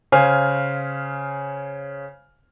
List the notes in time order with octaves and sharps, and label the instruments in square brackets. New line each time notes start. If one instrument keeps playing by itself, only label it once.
[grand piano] C#3 C5 F5 G#5 F6